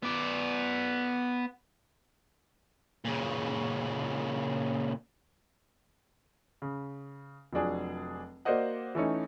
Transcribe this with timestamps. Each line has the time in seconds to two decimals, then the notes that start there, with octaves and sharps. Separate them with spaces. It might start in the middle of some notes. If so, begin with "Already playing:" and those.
0.03 B3 D5
3.05 A#2 C#3
6.62 C#3
7.53 F1 F3 F#3 D4 G#4
8.45 A#3 F#4 C5 D5 D#5 F#5
8.95 E3 A3 C#4 D#4